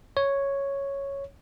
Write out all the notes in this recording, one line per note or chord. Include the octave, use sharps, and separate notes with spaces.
C#5